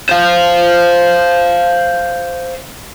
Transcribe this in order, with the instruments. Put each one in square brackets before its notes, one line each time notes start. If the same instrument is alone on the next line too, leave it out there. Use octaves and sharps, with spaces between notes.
[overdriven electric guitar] C5 F5